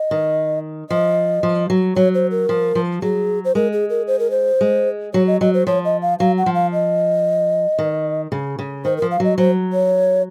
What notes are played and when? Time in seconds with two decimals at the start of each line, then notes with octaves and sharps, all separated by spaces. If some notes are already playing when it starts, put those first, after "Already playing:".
Already playing: D#5
0.11 D#3
0.90 F3 D#5
1.43 F3
1.70 F#3
1.96 F#3 C#5
2.14 C5
2.31 A#4
2.49 F3
2.75 F3
3.02 F#3 G#4
3.45 C5
3.55 G#3 A#4
3.73 G#4
3.90 A#4
4.07 C5
4.19 A#4
4.31 C5
4.61 G#3
5.14 F#3 C#5
5.27 D#5
5.41 F#3 D#5
5.54 C5
5.67 F3 C#5
5.85 D#5
6.02 F5
6.19 F#3 F5
6.38 F#5
6.46 F3
6.55 F5
6.73 D#5
7.78 D#3
8.32 C#3
8.59 C#3
8.85 D#3 C5
8.97 A#4
9.02 F3
9.11 F5
9.20 F#3 D#5
9.38 F#3 C5
9.73 C#5